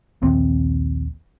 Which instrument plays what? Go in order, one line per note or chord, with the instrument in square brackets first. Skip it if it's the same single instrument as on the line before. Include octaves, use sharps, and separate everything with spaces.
[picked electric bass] A#1 D#2 C4